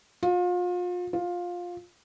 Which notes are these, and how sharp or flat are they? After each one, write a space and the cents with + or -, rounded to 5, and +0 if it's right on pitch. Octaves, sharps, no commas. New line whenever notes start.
F4 +35
F4 +15